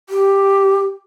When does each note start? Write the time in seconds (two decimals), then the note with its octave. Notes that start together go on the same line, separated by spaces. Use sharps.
0.09 G4